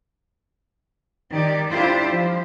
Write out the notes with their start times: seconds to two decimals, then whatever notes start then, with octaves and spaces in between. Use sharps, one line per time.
1.31 D#3 G4 D5
1.68 D4 E4 F4 G4 C5
2.11 F3